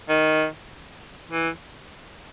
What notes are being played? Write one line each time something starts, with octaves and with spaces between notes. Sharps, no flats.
D#3
E3